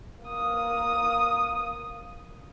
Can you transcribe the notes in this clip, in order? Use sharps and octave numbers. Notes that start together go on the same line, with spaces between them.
A#3 D#6